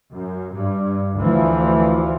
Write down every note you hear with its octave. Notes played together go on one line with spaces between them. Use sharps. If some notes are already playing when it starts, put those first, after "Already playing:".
F#2
G2
D2 E3 F3